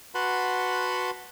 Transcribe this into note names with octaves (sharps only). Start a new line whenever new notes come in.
F#4 B4 F#5 A5 B5 C6